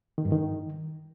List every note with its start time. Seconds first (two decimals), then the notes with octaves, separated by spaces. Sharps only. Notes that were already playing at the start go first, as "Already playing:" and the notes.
0.18 D#3
0.25 G2
0.32 D#3